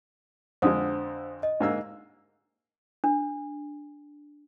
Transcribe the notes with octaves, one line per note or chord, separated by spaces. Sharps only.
F2 D3 G#3 C5 F#5 D#6
D#5
G#2 A#3 E6
D4